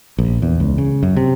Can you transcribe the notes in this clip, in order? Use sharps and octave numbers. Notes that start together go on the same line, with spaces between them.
A#1
E2
C#2
C#3
F#2
C3